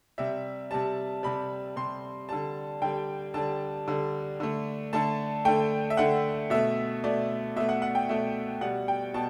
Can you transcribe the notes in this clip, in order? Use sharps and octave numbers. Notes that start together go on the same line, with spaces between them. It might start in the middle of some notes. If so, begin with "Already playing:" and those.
C3 G3 E5
C3 G3 A5
C3 G3 B5
C3 G3 C6
D3 G3 A5
D3 G3 G5
D3 G3 A5
D3 G3
D3 A3
D3 A3 A5
D3 A3 G5
E5
D3 A3 F#5
B2 A3 E5
B2 A3 D5
B2 A3 E5
F#5
F#5
G5
B2 A3 E5
B2 G3 F#5
G5
B2 A5